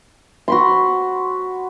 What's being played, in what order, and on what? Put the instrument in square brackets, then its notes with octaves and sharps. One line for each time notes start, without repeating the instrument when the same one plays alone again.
[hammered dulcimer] F#4 B5 C6